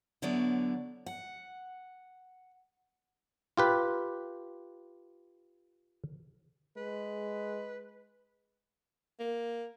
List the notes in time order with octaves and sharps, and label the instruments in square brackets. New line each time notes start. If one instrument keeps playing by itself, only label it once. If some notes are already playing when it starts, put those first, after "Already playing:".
[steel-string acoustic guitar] D3 F#3 B3 E4 C#5 D5
F#5
[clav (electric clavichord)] F4 G4 B4
[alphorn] G#3 [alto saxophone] B4
[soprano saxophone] A#3